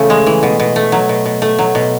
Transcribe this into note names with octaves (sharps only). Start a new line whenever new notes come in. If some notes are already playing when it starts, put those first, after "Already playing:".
Already playing: C#3 E3 A3
G#3
E3
B2
B2
A3
F#3
B2
B2
A3
F#3
B2